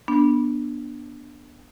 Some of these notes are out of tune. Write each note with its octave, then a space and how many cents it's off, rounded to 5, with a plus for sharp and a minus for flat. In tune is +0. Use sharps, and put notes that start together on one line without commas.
B3 -25 D4 +0